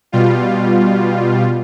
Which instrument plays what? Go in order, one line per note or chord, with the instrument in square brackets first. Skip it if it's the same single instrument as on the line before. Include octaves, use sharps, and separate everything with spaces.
[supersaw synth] B2 G3 F4